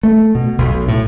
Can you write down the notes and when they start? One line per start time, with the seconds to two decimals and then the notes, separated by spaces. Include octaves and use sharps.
0.03 A3
0.35 B2
0.58 B1
0.88 A2